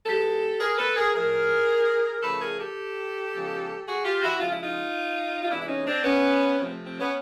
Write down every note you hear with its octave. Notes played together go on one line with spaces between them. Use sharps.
B2 G#3 B3 G4 A4
G#4 A#4
A4 B4
G#4 A#4
A2 F3 A3 G#4 A#4
C#3 F3 A3 A4 B4
G#4 A#4
G4 A4
C#3 F3 G#3 B3
F#4 G#4
F4 G4
E4 F#4
C#3 F3 G#3 F4
E4
D#4 F4
F4
C3 E3 G#3 B3 D4 E4
E4
C#4 D#4
C4 D4
B3 C#4
C3 F3 A3 C4
C4
B3 C#4